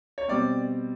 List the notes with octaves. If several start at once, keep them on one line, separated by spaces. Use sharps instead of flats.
C#5
B2 G3 C4 D5